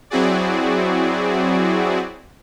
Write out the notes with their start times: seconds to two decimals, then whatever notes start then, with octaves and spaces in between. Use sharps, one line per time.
0.10 F#3 C4 E4 F#4 G#4 D5